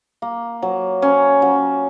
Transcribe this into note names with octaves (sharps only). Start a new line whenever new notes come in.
A#3
F#3
C#4
F#3